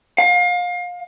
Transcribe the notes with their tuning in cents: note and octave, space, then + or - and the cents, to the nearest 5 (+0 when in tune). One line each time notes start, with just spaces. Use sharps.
F5 +30